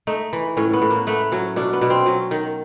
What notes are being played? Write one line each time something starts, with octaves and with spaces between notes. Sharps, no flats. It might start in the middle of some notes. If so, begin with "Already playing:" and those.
A3 D#4
E3
A2 C#4
B3
A2
A#3
A3 B3
F#3 C#4
B2 D4
B3
B2
C4
F#3 C#4
D#3